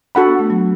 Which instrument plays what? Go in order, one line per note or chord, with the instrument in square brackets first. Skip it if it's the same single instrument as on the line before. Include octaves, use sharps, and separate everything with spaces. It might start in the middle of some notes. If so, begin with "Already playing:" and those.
[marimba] D4 [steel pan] F#4 A4 F#5 B5
[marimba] B3
A3
F#3